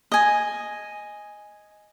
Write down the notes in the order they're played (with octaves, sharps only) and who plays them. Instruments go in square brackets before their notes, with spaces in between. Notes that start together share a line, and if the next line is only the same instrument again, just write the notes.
[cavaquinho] D#5 G#5